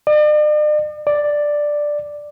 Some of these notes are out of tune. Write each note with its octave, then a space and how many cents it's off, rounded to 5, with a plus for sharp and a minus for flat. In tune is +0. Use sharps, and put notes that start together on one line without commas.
D5 +45
D5 +5